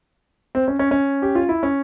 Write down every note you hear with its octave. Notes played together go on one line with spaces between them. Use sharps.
C4
C#4
C#4
C#4
G4
F4
E4
C#4